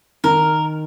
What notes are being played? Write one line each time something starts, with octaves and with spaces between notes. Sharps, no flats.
D#3 A#4